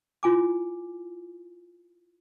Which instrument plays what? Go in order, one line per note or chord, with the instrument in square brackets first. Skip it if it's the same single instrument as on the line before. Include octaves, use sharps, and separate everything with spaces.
[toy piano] E4 F4 G#5 D6